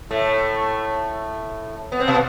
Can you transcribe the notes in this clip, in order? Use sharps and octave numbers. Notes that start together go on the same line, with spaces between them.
A2 A3
B3
C4
B2 B3